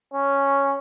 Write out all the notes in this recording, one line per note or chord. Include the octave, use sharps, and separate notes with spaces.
C#4